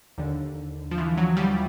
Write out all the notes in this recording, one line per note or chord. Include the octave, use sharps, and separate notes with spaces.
D#2 D3
F3
E3
F#3
G3